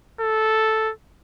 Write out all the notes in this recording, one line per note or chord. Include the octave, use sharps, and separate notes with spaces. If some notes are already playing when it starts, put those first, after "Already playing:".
A4